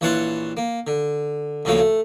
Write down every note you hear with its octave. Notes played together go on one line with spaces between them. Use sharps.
A#1 E3 C#5 F#5 A5 C6
A#3
D3
D2 C#3 F3 A3 A#3 C#5
A3